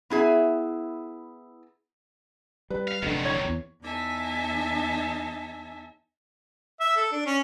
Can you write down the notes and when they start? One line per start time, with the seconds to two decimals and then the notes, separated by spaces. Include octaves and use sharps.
0.10 B3 E4 G#4 E5
2.70 G3 B4
2.88 F5
3.02 F1 G#2 D3 D#3 F#3
3.24 C#5 C#6 G#6
3.45 E2
3.81 E2 D#4 E5 G#5 A5
6.80 E5
6.96 A4
7.12 D4
7.26 C#4